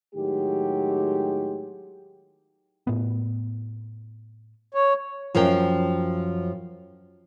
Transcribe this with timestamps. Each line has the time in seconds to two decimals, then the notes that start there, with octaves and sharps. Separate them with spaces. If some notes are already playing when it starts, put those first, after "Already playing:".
0.15 A2 D#3 F#3 G#3 G4
2.87 A2 B3
4.74 C#5
5.35 F#2 F3 C4 A#4 G5